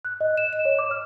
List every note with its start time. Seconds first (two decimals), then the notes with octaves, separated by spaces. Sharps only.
0.05 F#6
0.21 D#5
0.37 E7
0.53 E7
0.65 C#5
0.79 D6
0.91 F6